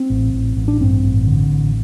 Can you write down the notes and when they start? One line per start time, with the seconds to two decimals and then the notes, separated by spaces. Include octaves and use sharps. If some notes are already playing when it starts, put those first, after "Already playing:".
Already playing: C4
0.10 A1
0.33 A1
0.56 A1
0.68 D4
0.80 G2 C4
1.03 A1
1.27 D3
1.50 A1